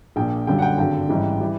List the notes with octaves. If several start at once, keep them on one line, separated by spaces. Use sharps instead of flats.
A#1 A#2 F3 G5
G1 F#2 D3 G3 G5
F#5
G5
G#1 G2 D3 F#3 G5
A1 G#2 E3 G3
E3 G3